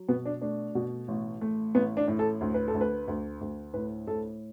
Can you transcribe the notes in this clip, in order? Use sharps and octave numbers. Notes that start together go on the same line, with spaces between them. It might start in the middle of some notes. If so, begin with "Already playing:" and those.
Already playing: F#3
B2 B3
D4
A3 D4
B2
A1
A3
A1 B3
D4
A2
A4
D2
B4
A4
D2
B4
D2
D2
A2 B4
A2 A4